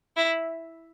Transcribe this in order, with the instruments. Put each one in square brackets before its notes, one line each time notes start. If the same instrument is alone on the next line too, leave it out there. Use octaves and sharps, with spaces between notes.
[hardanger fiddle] E4